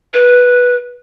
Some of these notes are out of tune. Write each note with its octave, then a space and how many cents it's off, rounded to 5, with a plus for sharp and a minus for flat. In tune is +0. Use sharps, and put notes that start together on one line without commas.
B4 -10